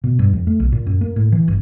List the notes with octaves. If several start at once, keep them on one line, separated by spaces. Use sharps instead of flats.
B2
G2
F2
A3
B1
A#2
F#2
A#3
A2
E3
G1